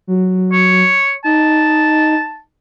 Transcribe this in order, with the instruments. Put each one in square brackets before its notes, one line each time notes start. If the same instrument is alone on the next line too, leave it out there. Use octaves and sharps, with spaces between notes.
[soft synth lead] F#3
[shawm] C#5
[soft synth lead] D#4 [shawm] A5